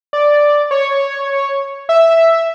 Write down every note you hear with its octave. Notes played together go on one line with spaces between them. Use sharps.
D5
C#5
E5